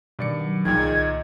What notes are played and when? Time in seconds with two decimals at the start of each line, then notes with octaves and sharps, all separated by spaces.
0.19 G2 B2 D#3 D5 C#7
0.40 F#3
0.65 A#1 A#2 D#3 F3 G3 G#4 G5 G#6
0.77 C2 D#5